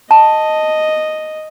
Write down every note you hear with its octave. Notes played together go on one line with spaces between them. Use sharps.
D#5 A5